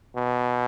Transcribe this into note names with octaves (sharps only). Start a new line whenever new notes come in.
B2